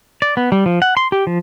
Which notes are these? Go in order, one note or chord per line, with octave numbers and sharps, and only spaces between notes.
D5
B3
G3
F3
F#5
C6
G4
F3